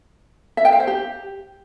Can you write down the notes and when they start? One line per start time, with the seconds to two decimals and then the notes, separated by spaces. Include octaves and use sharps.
0.57 E5
0.65 G5
0.72 F5
0.80 C5
0.87 G4